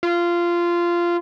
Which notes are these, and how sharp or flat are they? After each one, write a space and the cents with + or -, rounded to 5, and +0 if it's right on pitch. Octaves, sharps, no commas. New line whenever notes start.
F4 -15